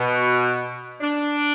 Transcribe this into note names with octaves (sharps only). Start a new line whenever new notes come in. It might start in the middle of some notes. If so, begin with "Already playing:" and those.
Already playing: B2
D4